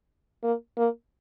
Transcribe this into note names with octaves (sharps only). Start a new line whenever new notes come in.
A#3
A#3